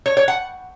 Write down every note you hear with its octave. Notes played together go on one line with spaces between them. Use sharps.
C#5
C#5
F#5